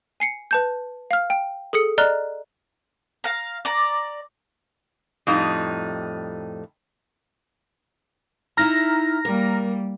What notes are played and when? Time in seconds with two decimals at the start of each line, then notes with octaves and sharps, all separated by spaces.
0.20 G#5 C7 C#7
0.51 B4 A5 G6
1.11 F5 F6
1.30 G5
1.73 G#4 A4 D#6 C#7
1.98 D5 D#5 A#5 F6 F#6 G7
3.24 F5 A#5
3.65 D5 A#5
5.27 F2 A2 G3 D#4
8.57 D#4 E4 E5 A#5 F6 A#6
9.25 G3 A#3 A#4